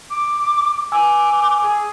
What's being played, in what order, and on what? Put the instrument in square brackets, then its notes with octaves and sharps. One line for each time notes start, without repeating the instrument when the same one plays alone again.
[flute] D6
[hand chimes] G#5 E6 [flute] D6
[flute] G#4